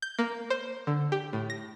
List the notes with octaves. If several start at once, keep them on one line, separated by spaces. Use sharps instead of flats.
G6
A#3
C5
D3
G4
A2
A#6